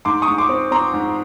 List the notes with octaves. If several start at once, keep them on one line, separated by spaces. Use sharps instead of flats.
G#2 C6 D6
C#6 D#6
G#2
C6 D6
C4
C4 A#5 C6
G#2